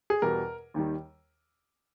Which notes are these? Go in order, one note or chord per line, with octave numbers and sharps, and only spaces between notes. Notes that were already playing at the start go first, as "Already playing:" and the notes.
G#4
E2 B2 G3 A#4
D#2 D#3 G3